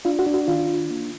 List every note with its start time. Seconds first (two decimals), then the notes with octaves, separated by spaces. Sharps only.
0.05 D4 F4
0.19 F#4
0.26 D4
0.34 F#4
0.48 D#3 F4
0.69 D4
0.90 A#3